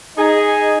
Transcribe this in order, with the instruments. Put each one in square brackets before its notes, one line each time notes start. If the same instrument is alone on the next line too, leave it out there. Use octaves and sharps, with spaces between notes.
[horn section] D#4 G#4